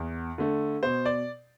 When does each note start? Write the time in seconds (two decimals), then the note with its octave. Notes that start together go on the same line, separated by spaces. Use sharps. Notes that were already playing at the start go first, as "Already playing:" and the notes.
Already playing: E2
0.38 D3 A3
0.83 B2 C5
1.06 D5